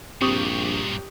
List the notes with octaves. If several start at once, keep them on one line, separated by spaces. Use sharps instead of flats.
A#1 G2 A#2 C4 G4 C#6 D#6